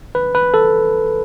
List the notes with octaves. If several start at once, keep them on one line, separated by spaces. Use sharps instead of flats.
B4
B4
A4